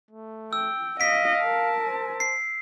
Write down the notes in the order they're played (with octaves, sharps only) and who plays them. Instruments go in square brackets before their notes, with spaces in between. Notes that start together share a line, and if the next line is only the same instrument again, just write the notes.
[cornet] A3
[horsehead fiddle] G5 [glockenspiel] E6
[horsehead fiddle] D#5 [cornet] F5 [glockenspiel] B6 D7
[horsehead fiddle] A#4 A5
[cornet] C5
[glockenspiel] C7